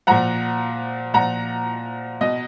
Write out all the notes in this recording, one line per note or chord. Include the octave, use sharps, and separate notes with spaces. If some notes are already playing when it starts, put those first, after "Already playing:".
A#2 F3 F#5 A#5
A#2 F3 F#5 A#5
B2 D#5